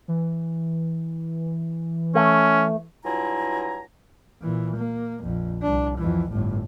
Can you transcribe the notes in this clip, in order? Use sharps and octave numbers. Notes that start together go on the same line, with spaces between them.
E3
A3 C#4
G2 F#3 E4 F4 G#5 A#5
A#2 E3
A#3
A#1 F2
C2 D4
F2 E3
G1 A2